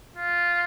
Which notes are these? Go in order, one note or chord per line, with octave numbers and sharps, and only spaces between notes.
F4